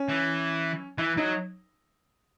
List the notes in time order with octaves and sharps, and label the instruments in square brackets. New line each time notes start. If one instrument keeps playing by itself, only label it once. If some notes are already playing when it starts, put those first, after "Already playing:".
Already playing: [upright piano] C#4
[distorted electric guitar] E3
[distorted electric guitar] E3 [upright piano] E4
[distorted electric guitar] F#3 [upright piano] D#4